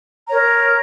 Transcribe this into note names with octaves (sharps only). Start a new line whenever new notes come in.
A#4 C#5 A#5